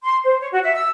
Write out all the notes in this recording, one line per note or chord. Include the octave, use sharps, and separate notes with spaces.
C6
C5
C#5
F#4
E5
E6